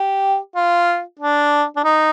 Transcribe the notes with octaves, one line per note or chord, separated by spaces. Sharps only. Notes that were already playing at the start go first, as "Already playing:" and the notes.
Already playing: G4
F4
D4
D4
D#4